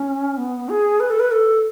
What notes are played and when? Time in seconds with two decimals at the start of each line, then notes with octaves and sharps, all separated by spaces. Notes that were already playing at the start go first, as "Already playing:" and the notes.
Already playing: C#4
0.37 B3
0.69 G#4
1.00 B4
1.10 A4
1.20 B4
1.31 A4